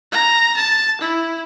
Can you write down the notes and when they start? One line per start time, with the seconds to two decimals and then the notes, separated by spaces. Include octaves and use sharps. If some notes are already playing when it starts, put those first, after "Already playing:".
0.12 A#5
0.57 A5
1.01 E4